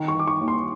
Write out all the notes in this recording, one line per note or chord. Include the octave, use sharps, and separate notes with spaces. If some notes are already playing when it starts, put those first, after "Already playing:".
Already playing: D#3
C#6
D#3 D6
C#6
D#2
C6